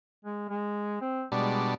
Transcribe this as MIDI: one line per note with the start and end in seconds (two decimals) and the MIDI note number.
0.25 0.46 56
0.49 0.97 56
1.01 1.24 60
1.32 1.74 47
1.32 1.74 55
1.32 1.66 56
1.32 1.74 62